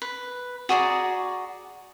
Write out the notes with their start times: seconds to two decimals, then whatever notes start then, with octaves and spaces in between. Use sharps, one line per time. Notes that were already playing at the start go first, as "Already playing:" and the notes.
0.02 B4
0.69 F#4 G#4 D5 A#5